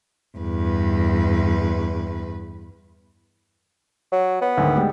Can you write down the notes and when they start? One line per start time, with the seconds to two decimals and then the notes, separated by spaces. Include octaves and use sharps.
0.38 E2 G2 B4
4.12 F#3
4.41 B3
4.57 D2 G#2 D#3
4.76 G3 G#3